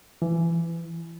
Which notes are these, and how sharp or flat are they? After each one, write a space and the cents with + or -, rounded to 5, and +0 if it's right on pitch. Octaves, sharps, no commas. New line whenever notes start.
E3 +25